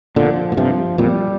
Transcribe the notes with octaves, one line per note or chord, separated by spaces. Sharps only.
A#2 D3 F3
A#2
G2 C3 F3
F2 A#2 G3